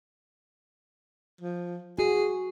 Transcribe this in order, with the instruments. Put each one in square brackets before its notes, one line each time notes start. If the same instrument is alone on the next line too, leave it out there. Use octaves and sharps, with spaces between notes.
[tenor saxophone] F3
[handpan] F#4 [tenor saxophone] G#4